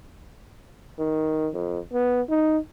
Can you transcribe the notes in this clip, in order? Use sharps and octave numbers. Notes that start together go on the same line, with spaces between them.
D#3
F2
B3
D#4